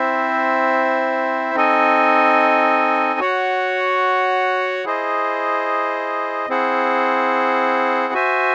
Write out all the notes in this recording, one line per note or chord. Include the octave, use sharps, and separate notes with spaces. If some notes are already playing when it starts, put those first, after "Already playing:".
Already playing: C4 E4 C5 E5
C4 D#4 A4 D#5 G#5
F#4 C#5 F#5
E4 G#4 C5 D#5
C4 E4 G#4 C5 F#5
F#4 C5 E5 G#5